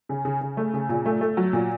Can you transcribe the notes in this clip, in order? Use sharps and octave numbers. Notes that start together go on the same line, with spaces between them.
C#3
C#3
C#3
A3
C#3
A#2
A3
A3
F#3
A#2